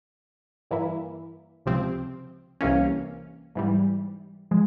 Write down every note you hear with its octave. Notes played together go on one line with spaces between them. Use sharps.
G2 E3 A#3 E4
C#2 C3 F3 C4
C2 C3 E3 A#3 C#4
G#2 E3 G3
F3 G#3